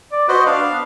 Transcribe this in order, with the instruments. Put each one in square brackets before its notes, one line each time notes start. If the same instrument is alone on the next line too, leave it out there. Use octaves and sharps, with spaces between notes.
[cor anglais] D5
[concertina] F#4 C5 D#5 [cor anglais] B4
[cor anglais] D4 [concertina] F5
[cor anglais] B3